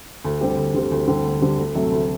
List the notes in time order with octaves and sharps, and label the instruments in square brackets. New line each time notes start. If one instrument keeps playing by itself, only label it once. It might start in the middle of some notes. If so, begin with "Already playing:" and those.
[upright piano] D2
D3 G3 C4 G4
D2
D3 G3 C4 G4
D2
D3 G3 C4 G4
D2
D3 G3 C4 G4
D2
C3 F#3 A3
D2